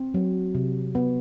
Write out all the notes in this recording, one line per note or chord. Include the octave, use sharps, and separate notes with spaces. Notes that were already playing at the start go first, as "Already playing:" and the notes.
Already playing: C4
F#3
C3
B3